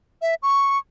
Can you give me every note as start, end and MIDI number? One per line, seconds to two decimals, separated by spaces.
0.22 0.35 76
0.43 0.78 85